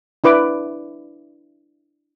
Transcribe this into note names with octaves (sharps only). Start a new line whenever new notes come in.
D4 E4 B4 D6